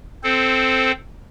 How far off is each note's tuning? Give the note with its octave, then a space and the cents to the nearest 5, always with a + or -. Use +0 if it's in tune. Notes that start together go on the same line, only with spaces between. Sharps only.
C4 -10 A4 -5 C5 +0